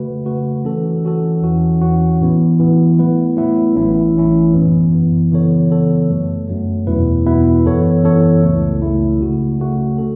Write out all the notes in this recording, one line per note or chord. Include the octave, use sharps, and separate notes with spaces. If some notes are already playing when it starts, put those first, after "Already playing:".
Already playing: C#3 A3 F#4 B4
C#3 A3 F#4 B4
E3 C#4 F#4 A4
E3 C#4 F#4 A4
E2 E3 C#4 F#4
E2 E3 C#4 F#4
A2 E3 B3
A2 E3 B3
A2 F#3 B3 E4 B4
A2 F#3 B3 E4 B4
A1 A2 E3 C#4 E4
A1 A2 E3 C#4 E4
F#2 E3 B3
F#2 E3 B3
C#3 E3 B3 A4 C#5
C#3 E3 B3 A4 C#5
F#2 F#3 A3
F#2 F#3 A3
E2 B2 B3 E4 B4
E2 B2 B3 E4 B4
F#2 E3 B3 A4 C#5
F#2 E3 B3 A4 C#5
C#2 C#3 A3 E4
C#2 C#3 A3 E4
C#3 A3 F#4
C#3 A3 F#4
C#4 A4